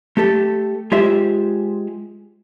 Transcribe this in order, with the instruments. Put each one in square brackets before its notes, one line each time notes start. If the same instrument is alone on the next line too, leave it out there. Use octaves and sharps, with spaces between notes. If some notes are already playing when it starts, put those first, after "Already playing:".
[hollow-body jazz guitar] A3 G4 A4
G#3 F4 G4 C5 E5